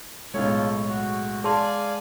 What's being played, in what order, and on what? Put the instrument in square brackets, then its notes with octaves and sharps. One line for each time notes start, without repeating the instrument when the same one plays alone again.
[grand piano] B1 A2 C#5 [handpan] G#3 [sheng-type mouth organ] F4 A4
[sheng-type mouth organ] F#4
[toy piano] G#4 A5 C6 [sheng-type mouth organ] D5 F5 G#5